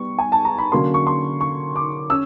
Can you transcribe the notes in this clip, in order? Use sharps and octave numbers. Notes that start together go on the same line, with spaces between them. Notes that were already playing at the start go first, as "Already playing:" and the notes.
Already playing: G3 B3 C#6
G#5
A5
A#5
B5
D3 F#3 A#3 C#4 C6
C#6
C6
C#6
D6
C#4 E6